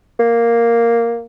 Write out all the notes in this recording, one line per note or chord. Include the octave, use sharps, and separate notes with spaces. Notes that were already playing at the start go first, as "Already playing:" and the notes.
A#3